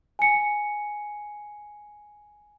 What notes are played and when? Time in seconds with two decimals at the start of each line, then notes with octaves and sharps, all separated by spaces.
0.19 G#5 C#7